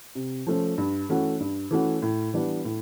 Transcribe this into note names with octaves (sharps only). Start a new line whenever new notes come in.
C3
F3 A3 C#4
G2
E3 A3 C#4 F#4
G2
E3 A3 C#4 F#4
A2
E3 G3 B3 D4
A2